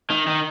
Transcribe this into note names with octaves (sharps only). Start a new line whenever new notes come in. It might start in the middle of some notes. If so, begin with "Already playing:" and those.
D#3
D#3